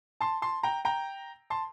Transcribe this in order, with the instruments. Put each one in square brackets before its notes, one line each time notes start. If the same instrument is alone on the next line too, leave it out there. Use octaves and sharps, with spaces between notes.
[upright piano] A5 C6
A5 C6
G5 A#5
G5 A#5
A5 C6